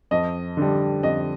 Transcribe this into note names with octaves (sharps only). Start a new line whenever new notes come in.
F2 D#5
D3 G3
F2 D#5